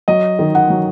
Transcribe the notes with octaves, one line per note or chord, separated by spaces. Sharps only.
F#3 D#5
D#3
F#5
F#3